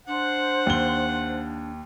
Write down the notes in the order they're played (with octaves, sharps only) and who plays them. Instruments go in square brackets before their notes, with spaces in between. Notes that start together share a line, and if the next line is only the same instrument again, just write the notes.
[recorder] D4 [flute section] C5 [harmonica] F#5
[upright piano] D#2 G7